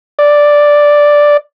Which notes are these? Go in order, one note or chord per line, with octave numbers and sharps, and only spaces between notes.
D5